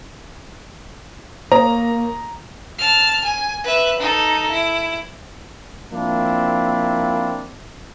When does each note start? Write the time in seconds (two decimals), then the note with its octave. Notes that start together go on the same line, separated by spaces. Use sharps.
1.52 A#3 C#5 A#5 C#6 D#6
2.79 A5 F6
3.24 G#5
3.64 B4 E5
4.00 D#4 A4
4.52 E4
5.92 F3 A#3 C4 D4 E4